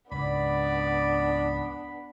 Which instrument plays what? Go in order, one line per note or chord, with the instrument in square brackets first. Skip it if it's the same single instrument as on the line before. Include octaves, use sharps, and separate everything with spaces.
[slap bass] C#2 G#2 [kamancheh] B3 D4 [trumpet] D5 [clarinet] B5